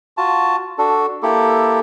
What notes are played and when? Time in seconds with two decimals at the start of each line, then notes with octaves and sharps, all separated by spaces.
0.17 F4 F#4 A5
0.78 D4 F#4 A4
1.23 A#3 E4 G4 A4